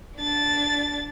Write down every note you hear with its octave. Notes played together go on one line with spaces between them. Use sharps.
D4 A6